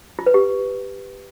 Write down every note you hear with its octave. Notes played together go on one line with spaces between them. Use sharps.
F4
B4
G4